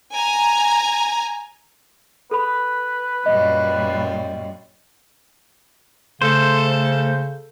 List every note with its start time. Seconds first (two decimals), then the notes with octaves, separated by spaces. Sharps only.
0.13 G#5 A#5
2.31 A4 B4 B5
3.26 F#2 A#2 G3 D#5
6.22 C#3 A3 A4 C5